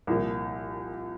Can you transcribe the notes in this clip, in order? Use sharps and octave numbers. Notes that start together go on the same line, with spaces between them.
C2 A#2 F3